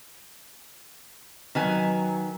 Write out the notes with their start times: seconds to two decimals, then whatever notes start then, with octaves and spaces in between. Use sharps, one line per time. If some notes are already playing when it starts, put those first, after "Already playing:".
1.55 D#3 F#3 B4 G#5